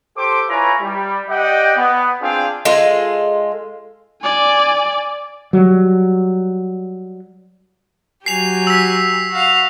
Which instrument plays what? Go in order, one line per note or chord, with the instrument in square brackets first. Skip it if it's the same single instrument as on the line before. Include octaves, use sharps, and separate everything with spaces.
[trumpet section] G4 A4 C5 D6
E4 F4 B4 C#5 G#5 A#5
G3
G4 D5 D#5 F#5 G5
B3
C4 D4 F4 G#4 F5 G5
[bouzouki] G#3 F4 A4
[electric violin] D5 G#5
[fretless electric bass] F#3 G3
[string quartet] F#3 G4 G#5 [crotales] C7 F7
[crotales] E6 B6
[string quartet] F#4 F5